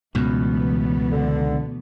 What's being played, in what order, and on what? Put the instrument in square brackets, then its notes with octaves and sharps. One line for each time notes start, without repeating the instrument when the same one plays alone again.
[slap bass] C#2 F#2 [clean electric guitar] B2 [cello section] E3 A3 B3
[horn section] D3